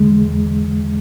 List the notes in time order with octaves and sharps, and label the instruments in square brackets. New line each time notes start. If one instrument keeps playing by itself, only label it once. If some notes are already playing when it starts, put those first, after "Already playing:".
Already playing: [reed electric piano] E2 D3 G#3